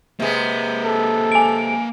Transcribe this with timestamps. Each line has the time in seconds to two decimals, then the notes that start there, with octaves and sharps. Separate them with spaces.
0.20 C3 G#3 A#3 B4
0.83 A4
1.32 G#5 D7